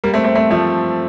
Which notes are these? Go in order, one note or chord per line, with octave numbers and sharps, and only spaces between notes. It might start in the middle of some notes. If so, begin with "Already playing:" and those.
G3 A#3
A3 C4
A3 C4
A3 C4
F3 A3